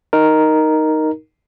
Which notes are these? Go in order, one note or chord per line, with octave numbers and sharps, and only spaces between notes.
D#4 A#4